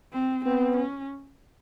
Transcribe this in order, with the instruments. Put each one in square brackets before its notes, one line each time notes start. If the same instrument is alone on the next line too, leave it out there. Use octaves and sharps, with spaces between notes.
[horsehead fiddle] C4
[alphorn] B3 [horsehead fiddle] C4
[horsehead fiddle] C#4